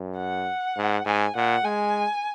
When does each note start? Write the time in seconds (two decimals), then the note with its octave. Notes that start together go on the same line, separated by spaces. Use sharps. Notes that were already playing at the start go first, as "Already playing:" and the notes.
Already playing: F#2
0.18 F#5
0.77 G#2
1.06 G#2 G#5
1.36 A#2 F#5
1.64 G#3 G#5